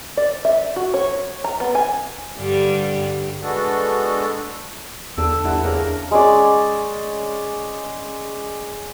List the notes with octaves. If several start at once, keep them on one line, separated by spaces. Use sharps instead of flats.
D5
E5
F#4
C#5
A#5
B3
G#5
G2 D3 G3
G#3 B3 D4 F#4 A4
E2 D3 A5 E6
E2 G2 D3 E4 F#5
E2 C#3 A#3 D4 A#4
G#3 C#4 D5